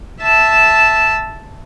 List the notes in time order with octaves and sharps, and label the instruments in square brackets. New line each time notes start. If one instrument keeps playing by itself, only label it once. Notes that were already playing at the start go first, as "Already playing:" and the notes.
[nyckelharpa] E5 A5